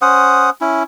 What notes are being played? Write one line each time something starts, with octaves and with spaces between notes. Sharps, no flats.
C#4 C5 F#5 D#6
C#4 E4